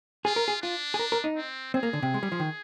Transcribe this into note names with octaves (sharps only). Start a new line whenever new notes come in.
F4 G#4
A#4
G#4
D4 F4
G#4
A#4
A#4
D#4
C4
C4 G#4
A#3
D3
C3
G#3
G3
F3
D#3